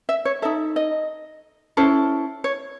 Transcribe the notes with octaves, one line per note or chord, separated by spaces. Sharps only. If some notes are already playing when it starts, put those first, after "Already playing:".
E5
C#5
D#4 A4 E5
D#5
C#4 E4 A4 C5
C#5